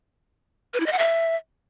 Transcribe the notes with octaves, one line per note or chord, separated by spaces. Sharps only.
B4
E4
D#5
F#5
E5